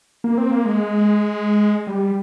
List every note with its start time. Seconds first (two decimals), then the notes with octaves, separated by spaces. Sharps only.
0.24 A#3
0.38 C4
0.51 A#3
0.65 G#3
1.87 G3